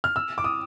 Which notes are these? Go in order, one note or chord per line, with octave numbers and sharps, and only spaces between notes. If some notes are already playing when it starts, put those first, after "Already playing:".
F6
E6
D6
D#6